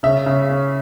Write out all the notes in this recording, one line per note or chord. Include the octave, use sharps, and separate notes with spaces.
C#3 E5
C#3
C#4